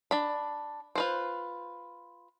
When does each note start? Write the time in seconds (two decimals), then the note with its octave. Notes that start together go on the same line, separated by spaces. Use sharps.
0.11 D4 B5
0.95 F4 B4 C5